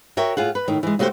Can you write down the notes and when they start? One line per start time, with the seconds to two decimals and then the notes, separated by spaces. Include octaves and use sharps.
0.17 F#4 A#4 C#5 E5 G5
0.37 A2 F4 G#4 F#5
0.55 B4
0.68 A2 D#3
0.83 E3 G#3
0.99 C#3 A3 F#4 G4 C5